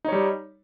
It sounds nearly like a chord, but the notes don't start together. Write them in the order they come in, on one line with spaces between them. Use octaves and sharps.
D#4 C#5 G3